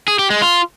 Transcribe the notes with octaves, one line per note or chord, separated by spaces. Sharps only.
G#4
G4
G#3
F4